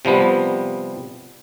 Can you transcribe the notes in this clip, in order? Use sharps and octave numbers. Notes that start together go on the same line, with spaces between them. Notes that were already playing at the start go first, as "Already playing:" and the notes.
C3 F3 G3 B3